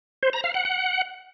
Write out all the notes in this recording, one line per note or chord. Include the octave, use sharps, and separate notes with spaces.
C5
A#5
F5
F#5
F#5